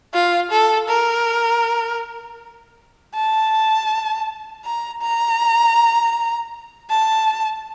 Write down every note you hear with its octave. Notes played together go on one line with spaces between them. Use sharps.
F4
A4
A#4
A5
A#5
A#5
A5